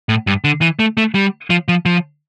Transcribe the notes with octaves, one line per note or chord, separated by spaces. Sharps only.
A2
G2
D3
E3
A3
A3
G3
F3
F3
F3